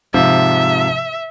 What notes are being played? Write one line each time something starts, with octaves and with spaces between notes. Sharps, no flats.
G#2 C3 F3 E5